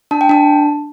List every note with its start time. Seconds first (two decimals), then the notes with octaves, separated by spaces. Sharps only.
0.11 D4 A5
0.21 G5
0.29 D4 A5